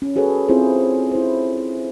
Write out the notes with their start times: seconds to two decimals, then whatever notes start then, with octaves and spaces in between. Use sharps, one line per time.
0.02 C#4
0.16 F#4 G#4 A4 B4 C#5
0.49 C4 E4 F4 G#4 C5
1.12 E4 C5